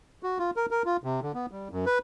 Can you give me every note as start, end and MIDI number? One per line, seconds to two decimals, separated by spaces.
0.23 0.38 66
0.39 0.51 65
0.56 0.66 70
0.71 0.83 70
0.85 0.97 65
1.04 1.20 48
1.22 1.32 50
1.34 1.46 59
1.51 1.68 55
1.71 1.85 42
1.86 1.98 71